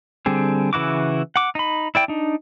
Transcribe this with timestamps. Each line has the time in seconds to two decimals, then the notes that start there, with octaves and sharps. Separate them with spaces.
0.26 D3 G3 C4 G#4
0.73 C#3 E3 E4 F#4 D6
1.36 F#5 D6
1.55 D#4 B5
1.95 E4 D5 G5
2.08 D4 D#4